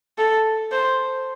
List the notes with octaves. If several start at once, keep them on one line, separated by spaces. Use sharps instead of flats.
A4
C5